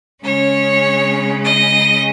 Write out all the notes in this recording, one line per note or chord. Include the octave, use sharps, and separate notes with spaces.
C#3 G#3 C#4 C#5
D#5